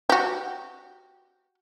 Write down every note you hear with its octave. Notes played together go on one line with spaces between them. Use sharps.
F#4 G4